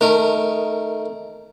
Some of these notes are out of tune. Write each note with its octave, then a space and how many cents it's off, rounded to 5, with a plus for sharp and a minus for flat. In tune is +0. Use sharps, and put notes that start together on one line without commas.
D#3 +0 A3 +0 A#4 -20